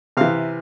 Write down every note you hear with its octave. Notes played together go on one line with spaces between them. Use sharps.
C3 E3 F5